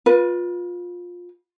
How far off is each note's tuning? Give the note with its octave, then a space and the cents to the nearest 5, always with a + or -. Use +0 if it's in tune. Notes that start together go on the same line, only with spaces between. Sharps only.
F4 +20 B4 -25